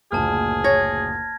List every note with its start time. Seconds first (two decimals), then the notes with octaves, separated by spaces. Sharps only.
0.12 F#1 D2 A#2 G#4 A5 F6
0.64 C#5 G#6 A#6